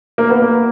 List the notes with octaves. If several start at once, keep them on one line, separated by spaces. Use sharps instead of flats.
A#3
B3
A#3